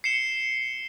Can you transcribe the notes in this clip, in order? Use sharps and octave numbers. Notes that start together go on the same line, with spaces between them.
C7 C#7 E7 G7